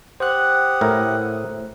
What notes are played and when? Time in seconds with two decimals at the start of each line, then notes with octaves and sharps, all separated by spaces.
0.20 G4 C5 F#5 D#6 F#6
0.81 A2 E4 A#4